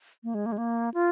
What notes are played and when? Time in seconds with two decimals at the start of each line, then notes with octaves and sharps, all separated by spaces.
0.24 A#3
0.35 G#3
0.46 A#3
0.52 G#3
0.58 A#3
0.94 F4